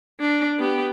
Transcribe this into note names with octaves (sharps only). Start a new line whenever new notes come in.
D4
B3 G4